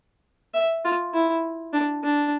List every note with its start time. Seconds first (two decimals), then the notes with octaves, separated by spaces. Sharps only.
0.54 E5
0.84 F4
1.14 E4
1.74 D4
2.03 D4